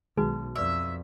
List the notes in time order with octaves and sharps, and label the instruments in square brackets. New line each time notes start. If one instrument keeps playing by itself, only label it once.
[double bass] B1 [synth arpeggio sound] D#3 G#3 G#4 [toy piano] D#4 F#4 B4
[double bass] F2 [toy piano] B4 D5 C#6 [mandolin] E5